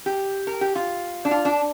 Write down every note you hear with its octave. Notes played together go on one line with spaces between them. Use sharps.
G4
A#4
G4
F4
D4
F4
D4